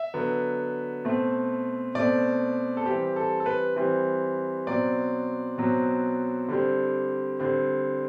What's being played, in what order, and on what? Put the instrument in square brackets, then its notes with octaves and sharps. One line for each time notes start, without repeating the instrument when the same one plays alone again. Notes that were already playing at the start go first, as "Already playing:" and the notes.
Already playing: [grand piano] E5
D3 F#3 B3
B2 A3 C4
B2 A3 C4 D5
A4
E3 G3 C4 G4
A4
A4
B4
E3 G3 C4
B2 F#3 C4 D5
B2 F#3 C4
D3 G3 C4
D3 G3 C4